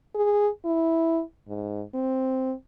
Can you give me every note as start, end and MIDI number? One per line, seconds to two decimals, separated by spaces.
0.15 0.49 68
0.65 1.21 64
1.48 1.83 44
1.94 2.53 60